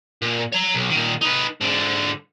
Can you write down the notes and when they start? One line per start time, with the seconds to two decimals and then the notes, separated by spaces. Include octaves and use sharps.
0.22 A#2
0.52 C#5 A#5
0.74 B1
0.90 A#2 D#3
1.21 D#4 B4
1.61 G#2 D3